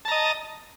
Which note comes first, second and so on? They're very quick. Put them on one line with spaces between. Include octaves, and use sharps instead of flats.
A5 A#5 D#5